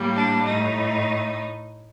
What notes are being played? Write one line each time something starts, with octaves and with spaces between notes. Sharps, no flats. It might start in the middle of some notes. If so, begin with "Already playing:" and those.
Already playing: A2 G3 A#3
D4
A2 A3 D#4